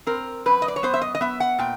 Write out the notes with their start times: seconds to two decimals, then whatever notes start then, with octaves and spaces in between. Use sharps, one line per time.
0.07 C4 A#4
0.46 F#2 B4
0.62 D#5
0.68 D5
0.76 C#5
0.83 B3 C5
0.94 E5
1.01 D#5
1.15 D#5
1.21 B3 E5
1.40 F#5
1.59 A#2 G5